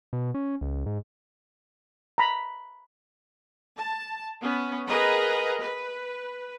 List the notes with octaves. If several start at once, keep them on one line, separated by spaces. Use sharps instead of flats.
B2
C#4
C#2
G#2
A#5 B5
A5
B3 C#4
G#4 A#4 B4 D#5 F#5 A#5
B4